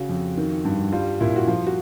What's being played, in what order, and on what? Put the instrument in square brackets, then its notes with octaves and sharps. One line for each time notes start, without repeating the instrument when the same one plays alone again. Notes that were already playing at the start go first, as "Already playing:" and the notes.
Already playing: [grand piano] C#3 F#4
F2
D#3
G2
G3 F4
A#2 E4
F#4
F3 F4
F#4